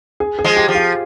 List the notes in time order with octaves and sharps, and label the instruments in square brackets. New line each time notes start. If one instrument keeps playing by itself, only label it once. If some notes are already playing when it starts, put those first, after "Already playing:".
[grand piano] G#4
G#4
[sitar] F3 G#3
[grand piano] G4
[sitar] F3
[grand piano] F4